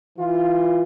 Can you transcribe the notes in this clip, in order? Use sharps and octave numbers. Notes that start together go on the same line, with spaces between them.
E3 F4